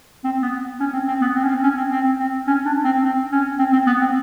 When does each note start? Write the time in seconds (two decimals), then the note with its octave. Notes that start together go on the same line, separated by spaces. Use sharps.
0.24 C4
0.42 B3
0.80 C#4
0.93 C4
1.08 C4
1.21 B3
1.35 C4
1.44 C#4
1.49 C4
1.63 C#4
1.77 C4
1.92 C4
2.19 C4
2.47 C#4
2.66 D4
2.85 C4
3.04 C4
3.32 C#4
3.59 C4
3.73 C4
3.87 B3
4.01 C4